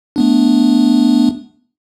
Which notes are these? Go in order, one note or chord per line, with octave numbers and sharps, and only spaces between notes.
A3 B3 D4